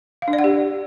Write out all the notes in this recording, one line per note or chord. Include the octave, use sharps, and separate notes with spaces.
F5
D4
D5
F#5
G4